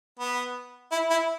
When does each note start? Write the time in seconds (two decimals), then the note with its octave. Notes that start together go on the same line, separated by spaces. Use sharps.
0.19 B3
0.91 E4
1.10 E4